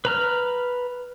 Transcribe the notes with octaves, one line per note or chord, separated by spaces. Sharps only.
B4 A#5 F6